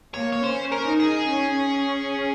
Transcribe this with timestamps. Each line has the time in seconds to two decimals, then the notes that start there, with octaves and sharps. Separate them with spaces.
0.14 A#3 C#5
0.32 C#5
0.44 C#4 C5
0.72 A#4
0.86 D#4
1.00 G#4
1.29 C#4